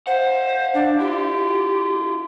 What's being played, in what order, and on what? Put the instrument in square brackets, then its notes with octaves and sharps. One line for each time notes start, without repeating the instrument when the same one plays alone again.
[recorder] C5 [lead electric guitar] F5 F#5
[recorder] D4
[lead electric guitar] E4 F4 [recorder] G4